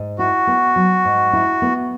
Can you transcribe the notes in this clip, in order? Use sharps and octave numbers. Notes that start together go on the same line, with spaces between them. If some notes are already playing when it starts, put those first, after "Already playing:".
Already playing: G#2
E4 F#4
B3
F#3
G#2
E4
B3